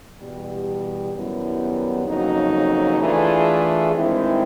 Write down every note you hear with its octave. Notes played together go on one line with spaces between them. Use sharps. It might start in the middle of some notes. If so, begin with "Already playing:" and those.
E2 B2 G3
F#2 D#3 G3 B3 E4
F2 C#3 F#3 A#3 D#4
E3 A3 D4 F4 G#4
G2 D#3 G#3 C4 E4